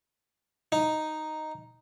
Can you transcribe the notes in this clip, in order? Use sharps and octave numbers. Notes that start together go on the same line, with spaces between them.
D#4